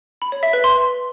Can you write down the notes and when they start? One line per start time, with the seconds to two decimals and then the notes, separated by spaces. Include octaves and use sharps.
0.22 B5
0.32 C#5
0.43 E5
0.53 B4
0.64 C6